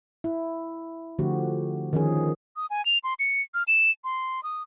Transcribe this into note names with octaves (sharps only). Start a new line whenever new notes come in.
E4
D3 F3 A3 F#4 G4
D#3 F3 C#4 G#4
D#6
G#5
F7
C6
C#7
F6
E7
C6
D#6